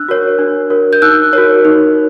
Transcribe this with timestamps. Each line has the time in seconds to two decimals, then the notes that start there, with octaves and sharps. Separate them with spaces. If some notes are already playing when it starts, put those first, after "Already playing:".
Already playing: D4 E6 F#6
0.08 F#4 A#4 C#5
0.39 D4
0.70 F#4 A#4 C#5
0.93 G6
1.02 D#4 E6 F#6
1.33 F#4 A#4 C#5
1.65 D#4